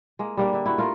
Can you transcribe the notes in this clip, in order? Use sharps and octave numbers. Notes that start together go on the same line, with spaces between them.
G#3 A#3
G3 A#3 D4
D3 E5
E4 F#4
A3 F4 A#4